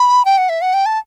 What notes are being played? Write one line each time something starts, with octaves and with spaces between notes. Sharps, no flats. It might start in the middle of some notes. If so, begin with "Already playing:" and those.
Already playing: B5
G5
F#5
E5
F#5
G5
A5